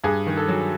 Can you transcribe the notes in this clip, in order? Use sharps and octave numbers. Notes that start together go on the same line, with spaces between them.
G2 G#4
D#3
A4
F#3